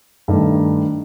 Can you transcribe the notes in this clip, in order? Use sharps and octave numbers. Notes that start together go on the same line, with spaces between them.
G2 D#3 A3